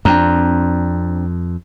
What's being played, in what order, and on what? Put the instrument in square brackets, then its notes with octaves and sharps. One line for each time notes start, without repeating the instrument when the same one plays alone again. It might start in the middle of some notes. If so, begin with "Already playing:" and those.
[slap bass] F2 [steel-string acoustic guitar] C4 D4 A#5